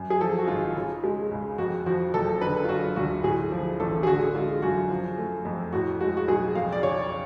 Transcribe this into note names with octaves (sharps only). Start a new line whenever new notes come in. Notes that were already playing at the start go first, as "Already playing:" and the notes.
Already playing: F#2
G#4
F3 A4
F#4
G#1 F4
C#3
G#3
C#2
F2 F#4
F3 F#4
F#1 A4
D3 B4
F4
F#3 F#4
D2 F#4
A2 G#4
F3
A1 A4
G#4
D3 F#4
G#3 F4
F#2 F#4
F3
A3
F2
A2 F#4
G#3 F#4
F#4
B1 G#4
F2 F5
D5
C#3 C#5